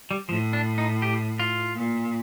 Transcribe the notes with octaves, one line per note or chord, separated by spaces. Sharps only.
G3
A2 F3
D4
D#4
G4
F4
A#2